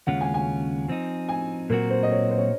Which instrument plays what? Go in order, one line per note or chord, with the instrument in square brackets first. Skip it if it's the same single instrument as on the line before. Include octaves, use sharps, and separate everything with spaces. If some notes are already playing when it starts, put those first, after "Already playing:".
[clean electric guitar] D#2 C#3 G#3 C#4 F4 [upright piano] F#5
[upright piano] G#5
G#5
[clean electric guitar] F3 C4 D#4
[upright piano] G#5
[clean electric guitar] A#2 F#3 C4 F#4 [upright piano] A#4
[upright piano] C5
D#5
C#5
C5
C#5